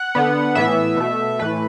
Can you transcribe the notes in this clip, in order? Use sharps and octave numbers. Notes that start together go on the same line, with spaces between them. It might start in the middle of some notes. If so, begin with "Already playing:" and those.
Already playing: F#5
D3 B3
A2 E3 B3 E5
B2 A3
A2 E3 A3 B4